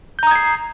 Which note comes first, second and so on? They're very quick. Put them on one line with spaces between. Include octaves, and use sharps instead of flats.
G6 A#5 D#6 G#6 C7